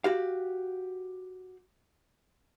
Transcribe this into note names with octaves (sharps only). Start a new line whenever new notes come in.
F#4 G4 F5